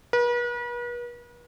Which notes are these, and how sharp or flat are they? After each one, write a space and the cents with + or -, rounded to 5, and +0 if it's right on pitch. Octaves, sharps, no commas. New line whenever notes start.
B4 -40